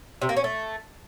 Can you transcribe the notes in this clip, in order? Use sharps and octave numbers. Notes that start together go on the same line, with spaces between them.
C3
A#3
C#4
A3